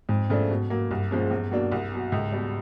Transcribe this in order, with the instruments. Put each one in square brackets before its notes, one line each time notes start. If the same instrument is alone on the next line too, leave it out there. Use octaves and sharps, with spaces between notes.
[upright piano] F2 [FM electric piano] G#2
[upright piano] C#3 F3 A3 D4
B2
F#3 A#3
[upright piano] C2 [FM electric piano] G2
[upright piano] A#2 F3 G#3 C#4
E2
B2 F#3 A#3 D4
C2
B2 F#3
[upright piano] C#2 [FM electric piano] G#2
[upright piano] B2 G3